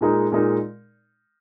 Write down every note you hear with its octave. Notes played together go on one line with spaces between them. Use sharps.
A#2 G#3 D#4 A#4
A#2 G#3 D#4 A#4